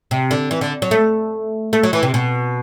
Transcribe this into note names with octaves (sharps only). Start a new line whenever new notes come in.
C3
D3
E3
D3
F#3
A3
A3
F#3
E3
C3
B2